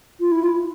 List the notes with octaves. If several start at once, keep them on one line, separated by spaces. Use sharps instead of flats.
F4
E4
F4